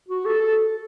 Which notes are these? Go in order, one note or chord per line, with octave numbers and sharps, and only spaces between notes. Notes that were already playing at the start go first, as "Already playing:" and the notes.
F#4
A4
A4